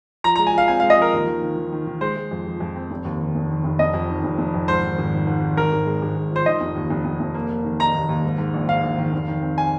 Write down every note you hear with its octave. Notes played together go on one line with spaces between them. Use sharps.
F3 A#5
A#5
G#3
G#5
F3 F5
C4 G#5
F5
G#3
D#5
F3 A#4
D#2
D#3
D#3
D#3
D#3
D#3
G#3 C5
G#3
F2
F3
F2
C4
F1
D#2
D#3
F1
D#3
F1
F1 D#5
F2
D#3
F1
F1
F2
G#2 C5
D#3
G#1
D#3
G#2
D#3
G#1 A#4
G#1
G#3
G#1
G#1
F3 C5
D#3 D#5
F1
D#2
F1
F1
F1
A#3
A#3
D#3
D#4 A#5
D#2
D#2
G#2
G#2
A#1
G#2 F5
A#1
D#3
F1
D#3
C4
G#5